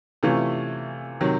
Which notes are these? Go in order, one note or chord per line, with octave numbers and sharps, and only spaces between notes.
C3 E3 A3 C#4 F4
C3 D#3 F#3